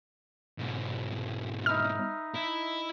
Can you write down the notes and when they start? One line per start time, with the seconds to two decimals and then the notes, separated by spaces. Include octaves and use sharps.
0.58 G#2 B2
1.66 D#4 B4 E5 F6
2.35 E4